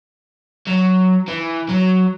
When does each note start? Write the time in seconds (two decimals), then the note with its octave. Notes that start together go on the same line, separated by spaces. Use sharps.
0.67 F#3
1.28 E3
1.69 F#3